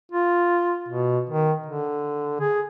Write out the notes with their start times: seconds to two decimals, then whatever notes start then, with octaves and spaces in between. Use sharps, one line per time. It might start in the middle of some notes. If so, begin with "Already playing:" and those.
0.12 F4
0.88 B2
1.30 D#3
1.66 D3
2.40 G#4